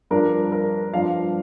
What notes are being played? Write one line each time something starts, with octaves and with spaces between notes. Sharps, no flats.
G2 F3 D4 A#4
A#4
G2 F3 D4 F5